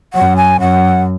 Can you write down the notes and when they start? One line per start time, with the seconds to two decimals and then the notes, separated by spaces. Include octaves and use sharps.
0.14 F#2 F#5
0.37 G#5
0.60 F#2 F#5